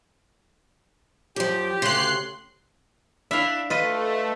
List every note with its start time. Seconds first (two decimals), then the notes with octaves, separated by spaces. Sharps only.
1.36 F#2 F3 G4
1.82 D2 C#3 C6 F#6 C7
3.31 D4 E4 E5 F5
3.70 A3 F4 B4 D#5